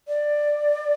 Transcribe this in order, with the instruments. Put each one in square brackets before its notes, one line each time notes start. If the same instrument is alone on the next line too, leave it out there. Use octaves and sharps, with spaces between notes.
[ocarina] D5